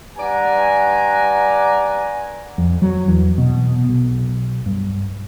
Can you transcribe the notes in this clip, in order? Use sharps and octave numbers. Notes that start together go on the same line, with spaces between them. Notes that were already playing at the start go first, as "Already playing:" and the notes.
G2 D5 F#5 G#5 A#5
F2
F#3
E2
B2
B1
G2